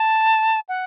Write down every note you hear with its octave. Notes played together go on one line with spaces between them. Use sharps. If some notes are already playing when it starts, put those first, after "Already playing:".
Already playing: A5
F#5